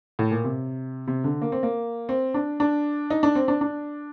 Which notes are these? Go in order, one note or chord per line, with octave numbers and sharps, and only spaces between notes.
A2
A#2
C3
C3
D3
A#3
C4
A#3
C4
D4
D4
D#4
D4
C4
D4
D4